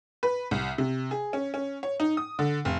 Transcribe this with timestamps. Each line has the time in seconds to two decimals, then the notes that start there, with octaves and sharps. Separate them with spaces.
0.23 B4
0.51 C2
0.78 C3
1.11 G#4
1.33 C#4
1.54 C#4
1.83 C#5
2.00 D#4
2.17 D#6
2.39 D3
2.65 F1